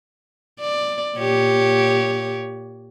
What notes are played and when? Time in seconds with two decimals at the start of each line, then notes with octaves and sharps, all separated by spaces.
0.61 D5
1.17 A#2 G4 C#5